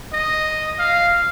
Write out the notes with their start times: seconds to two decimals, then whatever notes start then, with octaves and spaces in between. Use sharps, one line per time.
0.13 D#5
0.79 F5